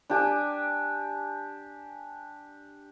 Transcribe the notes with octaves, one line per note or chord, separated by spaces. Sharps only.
D4 G4 G#5